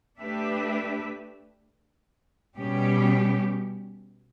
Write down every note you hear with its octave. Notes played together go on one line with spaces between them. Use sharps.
A3 D4 G4 B4 E5
B2 G3 C#4 G4